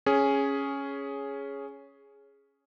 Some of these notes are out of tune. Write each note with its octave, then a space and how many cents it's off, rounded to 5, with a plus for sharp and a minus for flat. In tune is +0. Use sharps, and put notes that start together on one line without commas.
C#4 +0 G#4 +0